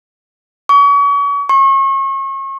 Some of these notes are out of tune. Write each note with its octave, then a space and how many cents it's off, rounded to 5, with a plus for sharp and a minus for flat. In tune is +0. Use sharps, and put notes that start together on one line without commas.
C#6 +35
C#6 -35